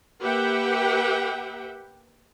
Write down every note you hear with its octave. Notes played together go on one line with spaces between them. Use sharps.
A#3 G4 B4 E5 F#5 G5